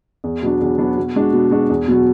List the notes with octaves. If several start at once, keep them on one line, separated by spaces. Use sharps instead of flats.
E2
B2 F#3 B3 D4
E2
B2 F#3 B3 D4
B2
G#3 D4 F#4
B2
G#3 D4 F#4
E2
B2 F#3